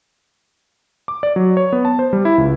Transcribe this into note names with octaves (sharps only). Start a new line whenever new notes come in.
D6
D5
F#3
C#5
B3
A5
C5
G3
E4
C#2